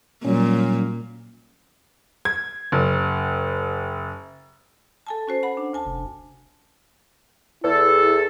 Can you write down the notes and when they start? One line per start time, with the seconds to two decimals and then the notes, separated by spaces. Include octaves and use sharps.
0.25 A#2 F#3 G3 C#4
2.25 G#6
2.72 F#1
5.07 A4 G#5 A5
5.27 C#4 F#4 C5
5.43 F#5 B5
5.57 D4
5.73 D2 G#5 A5
5.86 F1
7.64 E2 E4 A4